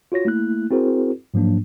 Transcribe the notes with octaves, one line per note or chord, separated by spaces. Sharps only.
F4 F#4 C#5 A#6
A3 A#3 E4 F#6
C4 E4 F#4 G#4 A#4 C5
G#2 F3 F#3 A#3 D4